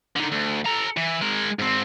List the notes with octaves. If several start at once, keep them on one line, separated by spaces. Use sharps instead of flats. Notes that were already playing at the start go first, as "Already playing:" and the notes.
D3 D#3
D2
A4 A#5
E3
G#3 A#4
G#2 C4